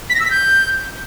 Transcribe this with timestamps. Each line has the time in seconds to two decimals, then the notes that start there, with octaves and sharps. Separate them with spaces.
0.10 B6
0.15 A#6
0.20 E6
0.25 B6
0.31 G6